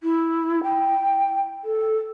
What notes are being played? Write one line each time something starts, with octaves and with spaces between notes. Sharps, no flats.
E4
G5
A4